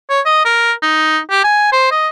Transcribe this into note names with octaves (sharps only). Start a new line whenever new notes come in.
C#5
D#5
A#4
D#4
G4
G#5
C5
D#5